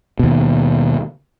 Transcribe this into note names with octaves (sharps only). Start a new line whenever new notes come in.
D#2 B2